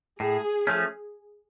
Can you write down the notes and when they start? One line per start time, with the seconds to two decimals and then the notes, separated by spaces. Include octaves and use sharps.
0.20 A2 G#4
0.67 F3 A3 C#4